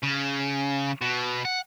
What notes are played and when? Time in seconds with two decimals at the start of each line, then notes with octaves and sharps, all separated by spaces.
0.03 C#3
1.01 B2
1.45 F#5